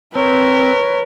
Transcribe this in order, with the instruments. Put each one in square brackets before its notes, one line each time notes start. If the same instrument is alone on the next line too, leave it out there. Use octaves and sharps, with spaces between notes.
[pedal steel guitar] C4 [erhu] A#4 [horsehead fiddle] B4 [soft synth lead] C#5